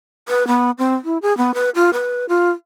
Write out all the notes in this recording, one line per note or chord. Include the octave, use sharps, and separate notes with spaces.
B4
B3
C4
E4
G#4
B3
B4
F4
B4
F4